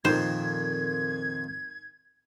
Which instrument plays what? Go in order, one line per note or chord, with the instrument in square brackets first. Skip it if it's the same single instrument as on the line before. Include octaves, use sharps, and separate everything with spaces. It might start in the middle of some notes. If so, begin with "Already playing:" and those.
[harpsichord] F2 A#2 D#3 [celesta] D#4 [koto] C5 [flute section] G#6